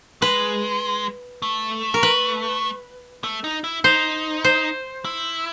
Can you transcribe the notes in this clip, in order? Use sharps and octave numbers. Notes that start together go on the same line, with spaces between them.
G#3 B4
A3
A#4
B4
A3
D#4
E4
D#4 C5
C5
E4